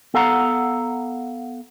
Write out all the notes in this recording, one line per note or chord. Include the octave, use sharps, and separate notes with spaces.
B3 A4 F5 F#5 A#5